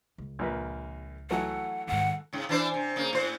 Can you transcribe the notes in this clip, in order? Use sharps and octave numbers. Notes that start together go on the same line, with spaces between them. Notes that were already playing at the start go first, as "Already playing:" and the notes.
C#2
A#1 A#3 B4
E3 F#3 A3 F#5
G#2 D#3 F#5
G#2 C#3
E3 D4 C5
C3
C#3 A#3
A2 C5